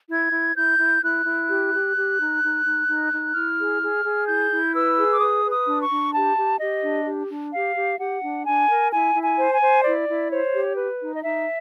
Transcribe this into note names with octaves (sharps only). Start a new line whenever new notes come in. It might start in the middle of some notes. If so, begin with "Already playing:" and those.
E4 G#6
E4
E4 G6
E4
E4 F#6
E4
G4
G4
G4
D#4
D#4
D#4
D#4
D#4
E4 F6
G#4
G#4
G#4
E4 G6
E4
B4 E6
G#4
D6
B4 D#6
B4
D#6
D4
C#6
D4
G4 A5
G4
G4 D#5
D4
G4
D4
G4 F5
G4
G4 F#5
D4
D4 G#5
A#4
E4 G#5
E4
G#5
C5
G#5
C5
E4 D5
E4
C5 C#5
G4
B4
D#4
D#5
D#4 E5